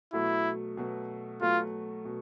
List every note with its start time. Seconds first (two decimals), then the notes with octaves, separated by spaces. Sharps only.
0.13 B2 F#3 A3 E4
0.77 B2 F#3 A3
1.41 B2 F#3 A3 F4
2.05 B2